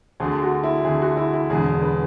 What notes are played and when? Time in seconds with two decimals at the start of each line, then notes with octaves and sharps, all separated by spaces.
0.20 D2 D3 G#4
0.42 F#4
0.64 E4
0.84 D2 D3 G#4
1.01 F#4
1.17 E4
1.34 E4
1.49 E1 E2 D3 G#4
1.82 B4